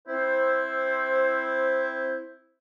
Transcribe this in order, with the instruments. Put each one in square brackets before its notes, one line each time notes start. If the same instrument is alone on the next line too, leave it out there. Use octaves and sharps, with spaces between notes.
[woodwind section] C4 E4 C5